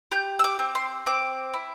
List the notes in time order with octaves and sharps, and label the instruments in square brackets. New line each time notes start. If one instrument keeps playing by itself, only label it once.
[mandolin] G4 G6
E6
D6
C4
C6
C4 D6
E4